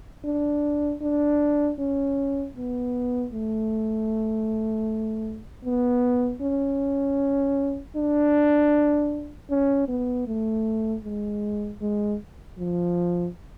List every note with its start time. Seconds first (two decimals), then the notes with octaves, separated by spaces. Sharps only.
0.25 D4
1.02 D4
1.79 C#4
2.57 B3
3.33 A3
5.65 B3
6.42 C#4
7.96 D4
9.50 C#4
9.88 B3
10.27 A3
11.04 G#3
11.82 G#3
12.59 F3